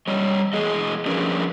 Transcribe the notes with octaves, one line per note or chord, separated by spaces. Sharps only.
G3 C#5 D#5
E2 G#4 D#5
F3 C#4 D4 G#4 A#4 B4